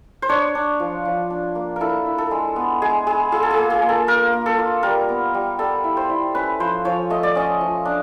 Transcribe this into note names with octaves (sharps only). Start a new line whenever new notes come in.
C5
D4 C#5
D4
F3
F3
D4
A#3
E4 A4 A#4
E4
A4
G#3
B3
G#3 G#4
G#3 G#4
F4 G#4
A4
G#4
A#3
G#4
A#3
A4
A#3 A#4
A#3
A4
F4
G3 A#4
B3
G3
G3 A4
E4
C5
E4
C#4 B4
F3 C5
F3 C#5
A3 D#5
D5
C#4 D#5
F3
D4